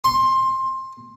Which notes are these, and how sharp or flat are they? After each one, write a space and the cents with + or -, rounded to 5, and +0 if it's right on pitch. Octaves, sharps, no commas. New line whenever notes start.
C6 +20